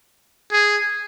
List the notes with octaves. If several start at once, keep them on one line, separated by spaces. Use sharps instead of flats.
G#4